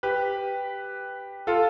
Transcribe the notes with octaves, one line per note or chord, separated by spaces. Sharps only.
G4 B4
F4 A4